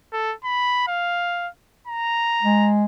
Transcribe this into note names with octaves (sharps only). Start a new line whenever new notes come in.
A4
B5
F5
A#5
G#3